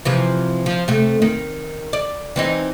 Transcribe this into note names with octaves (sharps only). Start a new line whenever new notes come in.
C3 E3 F3
F3
C3 A3
D#3
D5
E3 C4 D#4